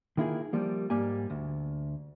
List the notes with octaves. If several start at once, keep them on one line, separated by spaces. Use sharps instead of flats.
D#3 A#3 E4 F4 G4 G#4
F3 G3 A#3
G#2 G3 A#3 G4 G#5
D2